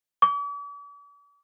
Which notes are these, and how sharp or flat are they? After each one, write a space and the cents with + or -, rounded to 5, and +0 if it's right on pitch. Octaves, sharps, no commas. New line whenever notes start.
D6 -45